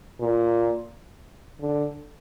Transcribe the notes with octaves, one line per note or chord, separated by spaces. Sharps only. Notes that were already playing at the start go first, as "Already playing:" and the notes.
A#2
D3